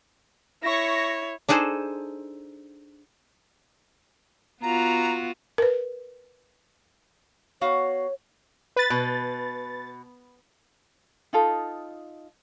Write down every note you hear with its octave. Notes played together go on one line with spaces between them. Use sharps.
E4 C#5 C#6 A#6
D4 D#4 G#4 A4 C5
B3 F4 F#4 A#5
A#4 B4
B3 F#4 C#5 F5
B4 A6
B2
D#4 F4 A4 D#5